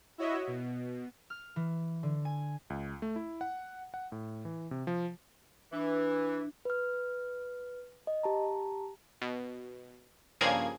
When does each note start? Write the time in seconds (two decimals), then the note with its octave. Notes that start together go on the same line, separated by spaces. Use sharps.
0.18 E4 F#4 C#5 D#5 E5
0.47 B2
1.30 F6
1.56 E3
2.03 D3
2.25 G#5
2.70 C#2
3.02 A3
3.16 E4
3.41 F#5
3.94 F#5
4.12 A2
4.45 E3
4.71 C3
4.87 F3
5.73 E3 D4
6.65 B4 F6
8.07 D#5
8.23 G4 A5 A#5
9.21 B2
10.41 G2 C#3 F3 A#3 G#4 G#6